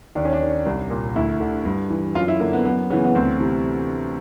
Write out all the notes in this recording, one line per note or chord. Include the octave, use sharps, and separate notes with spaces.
D#2 D4
C#4
D4
D#3
C2
A#2
D2 E4
D3
G2
E3
F#2 F4
E4
D3 A#3
B3
F#2 B3
C#3 E3 B3
B3
D2 C4
C3 E3